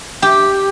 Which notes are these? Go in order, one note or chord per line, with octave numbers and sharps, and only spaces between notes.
G4